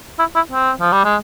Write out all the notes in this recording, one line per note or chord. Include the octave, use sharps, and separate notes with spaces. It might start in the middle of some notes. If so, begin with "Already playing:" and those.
E4
E4
C4
F3
G3
G#3